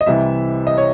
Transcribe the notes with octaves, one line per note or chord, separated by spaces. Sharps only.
D#5
C2 C3 E3 E5
D#5
C#5